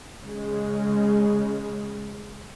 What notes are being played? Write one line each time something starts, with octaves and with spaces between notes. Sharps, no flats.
C#3 G#3